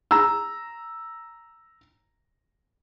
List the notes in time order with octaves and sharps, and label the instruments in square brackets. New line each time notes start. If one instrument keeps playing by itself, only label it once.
[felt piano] A#5 E6